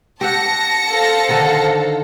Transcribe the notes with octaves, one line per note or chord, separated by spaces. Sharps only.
G4 E5 F#5 A5 A#6 C#7
A4 C5 F5
D3 D#3